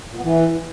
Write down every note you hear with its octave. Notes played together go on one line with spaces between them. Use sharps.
A#2
B3
E3